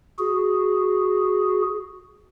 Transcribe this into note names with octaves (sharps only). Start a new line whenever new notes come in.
F#4 G#4